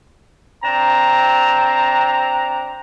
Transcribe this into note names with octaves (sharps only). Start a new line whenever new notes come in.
C4 D4 A#5